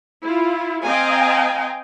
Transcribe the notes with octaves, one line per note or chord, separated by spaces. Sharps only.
E4 F4
C4 D#5 F5 G5 G#5 A#5